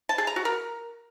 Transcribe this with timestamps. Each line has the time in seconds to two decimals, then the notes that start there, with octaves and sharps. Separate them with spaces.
0.09 A5
0.18 G#4
0.27 A#5
0.36 F#4
0.45 A#4